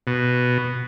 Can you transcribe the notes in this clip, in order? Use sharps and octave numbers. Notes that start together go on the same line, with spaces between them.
B2